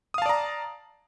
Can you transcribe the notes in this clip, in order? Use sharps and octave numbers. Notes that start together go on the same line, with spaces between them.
D5 F5 A5 A#5 D#6